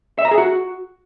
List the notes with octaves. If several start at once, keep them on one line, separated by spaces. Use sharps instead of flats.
E5
A#5
G#4
F#4